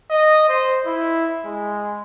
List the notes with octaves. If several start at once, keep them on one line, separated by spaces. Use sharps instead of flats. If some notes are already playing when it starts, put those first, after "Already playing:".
D#5
C5
E4
G#3